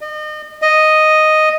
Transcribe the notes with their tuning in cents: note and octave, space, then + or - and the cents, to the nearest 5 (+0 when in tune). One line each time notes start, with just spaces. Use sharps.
D#5 -35
D#5 +0